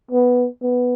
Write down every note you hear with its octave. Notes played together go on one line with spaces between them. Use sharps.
B3
B3